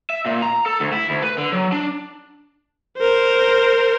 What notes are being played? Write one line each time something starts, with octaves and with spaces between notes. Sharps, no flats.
E5
A#2
A#5
A4
D2
E4
D2
B4
D3
F#3
D4
A#4 C5